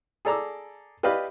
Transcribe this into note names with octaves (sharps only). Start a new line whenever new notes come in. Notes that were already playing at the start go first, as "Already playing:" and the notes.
G#4 A4 D5 A#5 D6 E6
G4 B4 D5 D#5 F5 B5